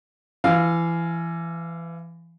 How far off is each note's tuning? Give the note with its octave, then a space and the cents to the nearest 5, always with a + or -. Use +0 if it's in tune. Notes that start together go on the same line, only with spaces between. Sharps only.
E3 +25 F5 -5